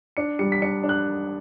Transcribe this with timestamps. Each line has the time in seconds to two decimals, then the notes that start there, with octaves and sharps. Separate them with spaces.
0.17 D4 C#7
0.39 G3 C#7
0.52 B6
0.62 D4 C#7
0.83 D4
0.89 F#6